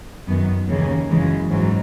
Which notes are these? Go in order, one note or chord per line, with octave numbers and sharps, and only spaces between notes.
F#2 D#3 B3
D#2 C#3 E3 A#3
F#2 C#3 E3 G#3
G#2 E3 F#3